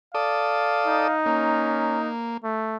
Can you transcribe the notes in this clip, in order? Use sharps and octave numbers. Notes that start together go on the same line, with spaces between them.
A4 D5 F5 D#6
D#4
A#3 C#4
A3